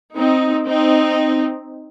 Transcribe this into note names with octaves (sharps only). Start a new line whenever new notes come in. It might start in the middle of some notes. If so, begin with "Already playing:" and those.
C4 D#4
C4 D#4